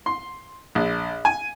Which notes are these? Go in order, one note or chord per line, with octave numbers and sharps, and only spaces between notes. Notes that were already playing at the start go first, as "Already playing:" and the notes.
C6
A#1
G#5